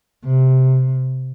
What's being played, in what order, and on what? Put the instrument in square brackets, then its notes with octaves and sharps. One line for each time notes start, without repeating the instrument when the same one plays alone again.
[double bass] C3